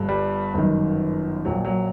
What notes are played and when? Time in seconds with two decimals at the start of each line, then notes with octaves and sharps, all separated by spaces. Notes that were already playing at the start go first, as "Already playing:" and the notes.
Already playing: G1 G2 D3
0.09 G3
0.54 G1 F#2 D#3
1.45 A#1 A#2 F#3
1.64 F#3